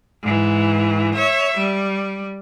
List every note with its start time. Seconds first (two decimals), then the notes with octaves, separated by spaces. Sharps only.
0.23 G#2 E3
1.16 C#5 E5
1.58 G3